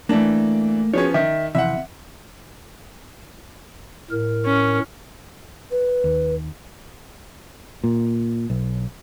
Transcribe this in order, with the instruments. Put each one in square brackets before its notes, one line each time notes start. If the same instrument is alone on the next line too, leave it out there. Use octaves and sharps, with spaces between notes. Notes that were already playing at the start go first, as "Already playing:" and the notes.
[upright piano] E3 D4 [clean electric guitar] A3 A#3
[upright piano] F3 B3 C#4 [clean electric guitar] F#4 G#4 C#5
[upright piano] D#3 [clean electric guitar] E5
[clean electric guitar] F2 C3 E3 [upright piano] E5 F#5
[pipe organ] A2 A#4
[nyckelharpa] C#4
[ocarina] B4
[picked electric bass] D#2
[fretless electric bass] A#2
B1